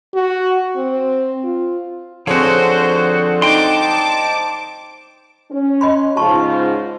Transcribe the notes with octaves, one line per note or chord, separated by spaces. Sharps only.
F#4
C4
F4
D3 F3 C4 F#4 G#4 C5 C#5
D#4 C5 G5 A5 C6 D6
C#4
D#5 B5 C6
G#2 C#3 F4 A5 C#6